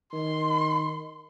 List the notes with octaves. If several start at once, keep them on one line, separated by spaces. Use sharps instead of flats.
D#3 C6